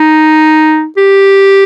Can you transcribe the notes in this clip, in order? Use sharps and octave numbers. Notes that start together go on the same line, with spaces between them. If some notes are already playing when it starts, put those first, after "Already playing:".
Already playing: D#4
G4